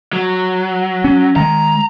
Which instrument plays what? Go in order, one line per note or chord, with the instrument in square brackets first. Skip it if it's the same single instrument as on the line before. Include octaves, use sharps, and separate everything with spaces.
[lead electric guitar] F#3
[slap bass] C#4
[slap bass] D#3 G#3 [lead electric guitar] A#5